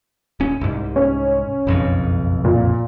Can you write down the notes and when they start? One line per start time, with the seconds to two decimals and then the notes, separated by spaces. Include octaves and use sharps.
0.40 D#1 C#4
0.61 C2 G#2
0.96 C#4
1.67 F#1 B1 F2
2.45 A#2